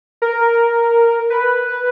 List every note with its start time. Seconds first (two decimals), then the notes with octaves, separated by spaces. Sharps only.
0.22 A#4
1.30 B4